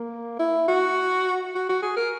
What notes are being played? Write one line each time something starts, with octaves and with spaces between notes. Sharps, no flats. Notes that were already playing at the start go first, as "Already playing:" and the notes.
Already playing: A#3
E4
F#4
F#4
F#4
G#4
A#4